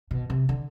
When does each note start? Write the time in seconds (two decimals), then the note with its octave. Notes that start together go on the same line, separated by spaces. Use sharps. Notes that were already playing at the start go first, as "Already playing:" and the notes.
0.11 B2
0.30 C3
0.49 D3